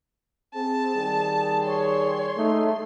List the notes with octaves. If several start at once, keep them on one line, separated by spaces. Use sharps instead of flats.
C4 G#4 A5
D#3 G3 G#4
C#5 C6
A3 D#4